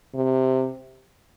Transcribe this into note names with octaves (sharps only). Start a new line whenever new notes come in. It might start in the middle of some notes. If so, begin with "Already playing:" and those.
C3